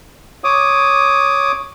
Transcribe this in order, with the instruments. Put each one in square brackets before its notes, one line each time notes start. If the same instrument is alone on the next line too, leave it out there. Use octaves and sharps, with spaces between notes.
[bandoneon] C#5 D6 D#6